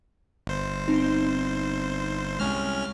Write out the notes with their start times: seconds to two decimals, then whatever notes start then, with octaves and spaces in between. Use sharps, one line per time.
0.47 G1 C5
0.88 C4 D#4
2.40 C2 G#3 C#4 F6